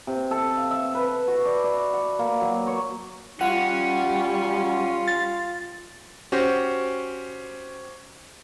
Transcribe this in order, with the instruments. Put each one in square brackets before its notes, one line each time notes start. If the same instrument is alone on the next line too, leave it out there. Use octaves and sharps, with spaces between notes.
[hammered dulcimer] C3
A4
F5
E5
B4
F#4
D5
D5
F#5
A#3
F#3
C#5
[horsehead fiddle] G3 [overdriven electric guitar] C#4 [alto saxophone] F4 [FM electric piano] F#5
[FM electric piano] A6
[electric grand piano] C#4 F#4 G4 C5